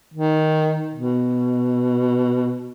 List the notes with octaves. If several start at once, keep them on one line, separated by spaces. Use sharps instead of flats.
D#3
B2